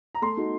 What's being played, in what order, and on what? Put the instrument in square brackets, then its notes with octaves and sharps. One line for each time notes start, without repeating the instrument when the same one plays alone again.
[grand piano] A#5
[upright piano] A3 [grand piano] C6
[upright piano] D#4 F#4